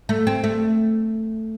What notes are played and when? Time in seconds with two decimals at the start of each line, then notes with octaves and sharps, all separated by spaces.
0.09 A3
0.27 C4
0.44 A3